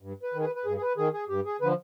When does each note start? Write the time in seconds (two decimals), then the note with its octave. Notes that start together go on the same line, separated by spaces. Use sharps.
0.02 G2
0.23 B4
0.34 D#3
0.40 G#4
0.44 B4
0.55 B4
0.65 G2 G#4
0.77 G#4
0.82 B4
0.97 D#3 G#4
1.13 G#4
1.29 G2 G4
1.45 G#4
1.61 D3 F3 B4